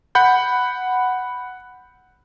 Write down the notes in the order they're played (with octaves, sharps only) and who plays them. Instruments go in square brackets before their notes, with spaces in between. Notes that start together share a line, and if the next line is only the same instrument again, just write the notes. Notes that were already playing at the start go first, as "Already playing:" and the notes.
[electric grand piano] F#5 B5 G6